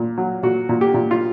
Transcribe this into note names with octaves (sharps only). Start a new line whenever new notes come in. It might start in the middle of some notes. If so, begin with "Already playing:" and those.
Already playing: A#2
F#3
A#2 F#4
A#2
G4
A#2
F4